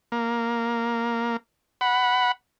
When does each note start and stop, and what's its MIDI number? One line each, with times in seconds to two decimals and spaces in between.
0.12 1.37 58
1.81 2.32 78
1.81 2.32 83